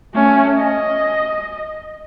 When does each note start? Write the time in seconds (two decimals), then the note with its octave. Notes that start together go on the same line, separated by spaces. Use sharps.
0.14 A3 C#4
0.58 D#5